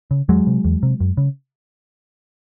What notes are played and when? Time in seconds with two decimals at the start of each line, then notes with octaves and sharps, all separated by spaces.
0.11 C#3
0.29 E2 F#3 G#3
0.47 C3
0.65 E2
0.83 C3
1.00 F#2
1.17 C#3